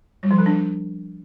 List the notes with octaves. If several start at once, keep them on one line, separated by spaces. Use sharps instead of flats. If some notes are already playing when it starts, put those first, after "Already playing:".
G3
F3
D#3
D4